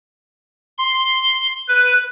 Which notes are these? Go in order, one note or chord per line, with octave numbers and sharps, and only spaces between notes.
C6
B4